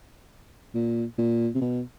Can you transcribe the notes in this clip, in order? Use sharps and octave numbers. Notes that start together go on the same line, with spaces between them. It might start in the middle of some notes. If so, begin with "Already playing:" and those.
A#2
A#2
C3
B2